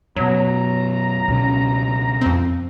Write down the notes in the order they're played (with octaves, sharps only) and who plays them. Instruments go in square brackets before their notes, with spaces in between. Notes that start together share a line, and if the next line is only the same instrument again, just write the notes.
[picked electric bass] F#2 B2 [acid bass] F#3 [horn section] A#5
[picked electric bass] C#2 B2 C#4
[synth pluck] F2 C4